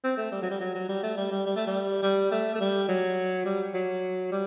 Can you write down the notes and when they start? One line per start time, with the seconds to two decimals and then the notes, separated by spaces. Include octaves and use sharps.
0.04 C4
0.17 A3
0.32 G3
0.42 F#3
0.51 G3
0.60 F#3
0.74 F#3
0.89 G3
1.03 A3
1.17 G3
1.31 G3
1.46 G3
1.56 A3
1.67 G3
2.02 G3
2.31 A3
2.55 A3
2.60 G3
2.88 F#3
3.45 G3
3.74 F#3
4.31 G3